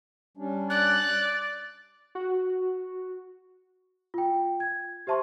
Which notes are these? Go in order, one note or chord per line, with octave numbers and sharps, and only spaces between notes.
G3 C#4 D4
D5 F#6
F#4
F4 G5
G#6
G4 C5 E5 A5 C6 C#6